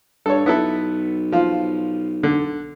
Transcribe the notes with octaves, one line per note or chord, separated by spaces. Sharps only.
G2 A4 C#5
B1 B3 E4 A4
F3 F4
D3